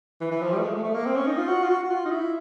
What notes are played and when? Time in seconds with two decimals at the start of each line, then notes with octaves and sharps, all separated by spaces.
0.21 E3
0.31 E3
0.42 F3
0.52 G3
0.58 A3
0.63 G#3
0.73 A3
0.84 A3
0.95 A#3
1.06 C4
1.16 C#4
1.27 D#4
1.37 F4
1.48 F#4
1.63 F4
1.69 F#4
1.83 F#4
1.90 F4
2.05 D#4
2.11 E4